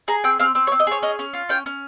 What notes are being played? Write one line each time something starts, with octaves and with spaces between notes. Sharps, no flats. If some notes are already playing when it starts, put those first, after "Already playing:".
G#4 A#5
C4 G5
C4 F5
C4
C#5
C4
D#5
G#4 C#5
C#4 D#5
C#4
F4
C#4 G5
C#4